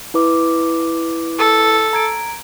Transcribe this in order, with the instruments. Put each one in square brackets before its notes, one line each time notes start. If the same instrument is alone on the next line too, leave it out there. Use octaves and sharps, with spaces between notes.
[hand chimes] E4 B4 D6
[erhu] A4
[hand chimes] A#5 G#6 D7